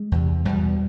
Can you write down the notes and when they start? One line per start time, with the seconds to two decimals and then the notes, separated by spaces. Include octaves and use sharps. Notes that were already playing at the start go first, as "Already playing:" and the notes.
Already playing: G#3
0.12 E2 C3
0.45 E2 B2 G3